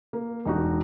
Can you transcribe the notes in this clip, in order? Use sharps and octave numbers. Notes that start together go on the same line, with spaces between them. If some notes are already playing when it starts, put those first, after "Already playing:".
A#3
E1 D#4 F#4